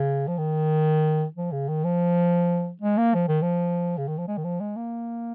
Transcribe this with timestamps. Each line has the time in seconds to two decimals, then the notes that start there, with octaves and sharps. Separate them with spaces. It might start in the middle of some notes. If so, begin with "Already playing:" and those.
Already playing: C#3
0.28 F3
0.38 D#3
1.36 F3
1.52 C#3
1.68 D#3
1.84 F3
2.82 G#3
2.98 A#3
3.14 F3
3.28 D#3
3.42 F3
3.97 C#3
4.08 D#3
4.18 F3
4.28 G#3
4.37 D#3
4.44 F3
4.60 G#3
4.77 A#3